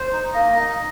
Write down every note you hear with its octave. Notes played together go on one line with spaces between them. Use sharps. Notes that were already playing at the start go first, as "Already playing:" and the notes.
Already playing: C5
D#4
A#3 D#5
D#4